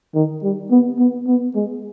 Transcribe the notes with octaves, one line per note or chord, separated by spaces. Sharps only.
D#3
G3
B3
B3
B3
G#3